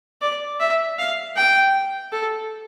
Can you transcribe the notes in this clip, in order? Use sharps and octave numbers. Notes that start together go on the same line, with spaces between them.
D5
E5
F5
G5
A4